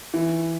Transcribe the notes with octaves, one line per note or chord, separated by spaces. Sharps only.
E3